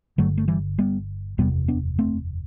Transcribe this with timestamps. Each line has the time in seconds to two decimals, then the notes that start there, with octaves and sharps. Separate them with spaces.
0.18 G1 G2 D3 F#3 A3
0.38 A3
0.48 E3 G3
0.78 G3 B3
1.38 F#1 E2 C3 G3 B3
1.68 B3 D4
1.99 A3 C4